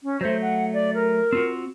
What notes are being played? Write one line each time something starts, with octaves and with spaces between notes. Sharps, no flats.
C#4
F#3 A3 C5
F#5
D5
A#4
C4 F4 F#4